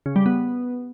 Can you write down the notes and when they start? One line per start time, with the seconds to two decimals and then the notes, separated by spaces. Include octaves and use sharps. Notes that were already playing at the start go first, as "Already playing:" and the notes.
0.06 C#3
0.16 G3
0.26 B3